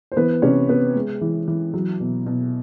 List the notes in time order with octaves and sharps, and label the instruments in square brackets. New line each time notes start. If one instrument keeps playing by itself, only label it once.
[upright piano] C5
E3 B3 B4
C3 C#4 C#5
B3 B4
G#3
E3
E3
F#3
B2
B2